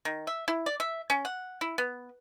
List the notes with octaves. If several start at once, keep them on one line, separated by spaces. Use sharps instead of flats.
D#3
E5
E4
D5
E5
C#4
F#5
E4
B3